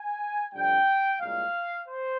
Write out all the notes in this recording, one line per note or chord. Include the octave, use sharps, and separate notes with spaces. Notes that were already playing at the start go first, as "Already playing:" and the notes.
Already playing: G#5
F2 C3 G3 D4 G5
C2 A#2 G#3 F5
C5